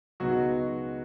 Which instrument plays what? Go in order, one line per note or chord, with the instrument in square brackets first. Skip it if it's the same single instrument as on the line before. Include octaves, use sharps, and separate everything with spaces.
[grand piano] C#2 B2 G#3 B3 D#4 [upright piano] F#3 F#4